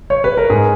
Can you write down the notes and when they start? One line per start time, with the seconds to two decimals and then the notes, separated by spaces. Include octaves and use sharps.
0.10 C#5
0.24 B4
0.37 A#4
0.50 G#2 G#4